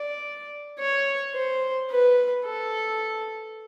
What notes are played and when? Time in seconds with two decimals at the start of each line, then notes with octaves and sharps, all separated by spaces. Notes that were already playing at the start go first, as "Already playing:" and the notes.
Already playing: D5
0.79 C#5
1.34 C5
1.91 B4
2.45 A4